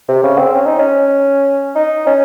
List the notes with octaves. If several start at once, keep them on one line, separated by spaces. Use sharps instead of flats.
C3
C#3
C4
C#4
D#4
C#4
D#4
C#4